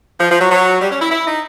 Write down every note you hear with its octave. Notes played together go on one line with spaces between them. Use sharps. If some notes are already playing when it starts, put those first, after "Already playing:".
F3
F3
F#3
F#3
G3
C#4
E4
E4
D#4